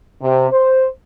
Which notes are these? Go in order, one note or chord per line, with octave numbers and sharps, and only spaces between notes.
C3
C5